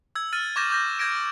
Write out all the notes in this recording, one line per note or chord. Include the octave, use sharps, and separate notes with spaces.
E6 G#6
F6 A6 D#7
C#6 D6 G6 G#6 A#6 E7
D6 G6 A#6
E6 G6 G#6 A#6 D7